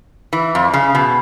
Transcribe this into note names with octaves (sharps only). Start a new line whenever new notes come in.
E3
F2
C#3
B2